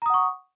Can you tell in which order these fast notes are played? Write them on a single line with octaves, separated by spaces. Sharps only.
A#5 D#6 F#5 C#6